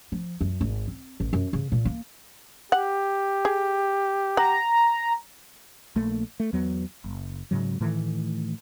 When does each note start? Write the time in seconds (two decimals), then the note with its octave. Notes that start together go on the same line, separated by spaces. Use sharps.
0.12 F3
0.41 F#2
0.61 G#1
0.88 C4
1.20 A1
1.33 F#2
1.53 C#3
1.72 A#2
1.85 A#3
2.72 G4 F#5
3.45 G#4
4.37 F#5 A#5
5.96 A#1 A3 A#3
6.40 A3
6.53 E2 F#3 B3
7.04 F#1
7.51 G#2 C#3 F#3
7.80 A2 D#3 E3 A3